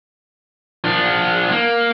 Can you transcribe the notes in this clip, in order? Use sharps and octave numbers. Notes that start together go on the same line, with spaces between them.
F3 D4
A#3